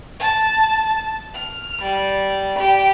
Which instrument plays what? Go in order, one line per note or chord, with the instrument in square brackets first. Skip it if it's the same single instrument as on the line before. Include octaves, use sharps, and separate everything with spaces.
[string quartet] A5
F6
G3
G4